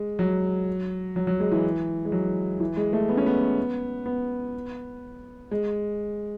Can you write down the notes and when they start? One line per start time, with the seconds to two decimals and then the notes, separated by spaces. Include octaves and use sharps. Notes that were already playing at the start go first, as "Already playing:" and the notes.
Already playing: G#3
0.19 F#3
1.16 F#3
1.27 F#3
1.40 G#3
1.52 E3
2.05 G#3
2.12 F#3
2.60 E3
2.77 G#3
2.93 A3
3.09 B3
3.17 C#4
3.26 B3
4.06 B3
5.51 G#3